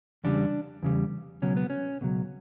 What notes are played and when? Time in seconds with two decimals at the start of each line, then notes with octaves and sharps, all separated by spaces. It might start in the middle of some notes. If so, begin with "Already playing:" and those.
0.24 E2 C#3 G3 D4
0.82 E2 C#3 G3
1.42 C#2 B2 F#3 C#4
1.56 B3
1.70 C#4
2.01 C#2 B2 F#3